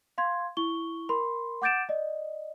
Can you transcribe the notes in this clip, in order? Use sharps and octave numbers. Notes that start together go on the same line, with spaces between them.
F5 C6 G#6
E4 C#6 G7
A#4 B5 C6
F#5 D6 G6 A6 D7 E7
D5 D#5